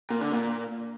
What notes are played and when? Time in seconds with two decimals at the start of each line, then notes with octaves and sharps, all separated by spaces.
0.10 A#2
0.21 D3
0.32 A#2